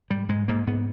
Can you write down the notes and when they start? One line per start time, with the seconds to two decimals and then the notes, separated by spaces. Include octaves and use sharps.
0.10 G#2 G3
0.29 G#2 G#3
0.48 G#2 A#3
0.67 G#2 B3